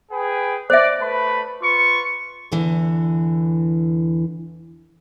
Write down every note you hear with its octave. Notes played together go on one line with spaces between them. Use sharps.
G#4 B4 G5
C5 D5 E5
A3 B4 B5
F4 B4 C#6
E2 D3 E3